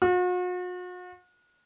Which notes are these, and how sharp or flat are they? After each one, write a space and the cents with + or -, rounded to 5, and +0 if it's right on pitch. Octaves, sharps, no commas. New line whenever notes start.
F#4 -45